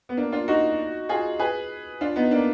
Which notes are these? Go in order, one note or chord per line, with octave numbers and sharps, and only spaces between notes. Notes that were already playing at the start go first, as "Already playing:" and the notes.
B3
A#3 D4
D4 F4
D#4 F#4
F4 G#4
G#4 B4
D4 F4
B3 D#4
A#3 D4